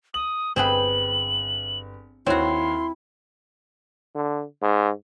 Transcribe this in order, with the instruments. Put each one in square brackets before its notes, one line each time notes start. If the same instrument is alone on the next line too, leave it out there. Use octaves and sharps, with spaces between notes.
[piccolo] D#6 [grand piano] F#7
[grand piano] G1 G5 [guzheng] C4 G#4 B4 [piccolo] F#7
[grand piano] D#2 C#5 [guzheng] C4 F#4 [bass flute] E4 [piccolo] C6
[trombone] D3
G#2